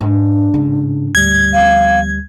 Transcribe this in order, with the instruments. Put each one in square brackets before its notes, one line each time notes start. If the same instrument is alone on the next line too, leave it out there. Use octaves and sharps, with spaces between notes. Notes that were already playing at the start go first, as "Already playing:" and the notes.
[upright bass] G#2 [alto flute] D4
[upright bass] A1 G#2 [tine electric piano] C#3
[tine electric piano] D2 G3 [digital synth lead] G#6
[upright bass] F3 B3 [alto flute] F5